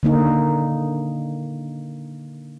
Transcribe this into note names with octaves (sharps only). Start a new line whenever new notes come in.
D3 A#3 D#4